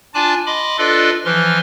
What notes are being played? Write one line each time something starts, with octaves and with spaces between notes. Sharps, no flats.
D4 F4 D5 G#5 A5 D6
D#5 B5 C6 D6
D4 F4 A4 B4 D5 D#5
E3 F3 B4 C6 F6